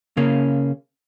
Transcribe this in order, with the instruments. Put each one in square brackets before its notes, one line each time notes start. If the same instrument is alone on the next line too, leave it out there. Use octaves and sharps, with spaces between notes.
[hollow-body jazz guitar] C#3 A#3 C#4